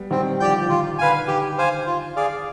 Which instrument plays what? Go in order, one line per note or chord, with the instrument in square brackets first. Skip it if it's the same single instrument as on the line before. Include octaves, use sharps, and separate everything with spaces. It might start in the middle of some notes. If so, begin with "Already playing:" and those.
Already playing: [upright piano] G3 B3
[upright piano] D#3 G3 [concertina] C4
[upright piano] D3 F3 [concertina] G4 D5 G5
[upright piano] F3
[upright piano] D#3 [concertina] F4
[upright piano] D3 [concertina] B4 F5 G#5
[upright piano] D#3 [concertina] G4
[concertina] C5 F5 G#5
F4
G#4 D5 F5